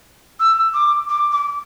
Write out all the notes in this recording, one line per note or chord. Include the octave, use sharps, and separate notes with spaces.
E6
D6
D6
D6